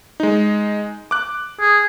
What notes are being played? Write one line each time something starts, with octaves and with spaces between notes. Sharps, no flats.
G#3 D#4
D6 F#6
G#4